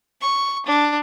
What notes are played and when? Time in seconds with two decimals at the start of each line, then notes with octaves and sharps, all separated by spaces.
0.21 C#6
0.66 D4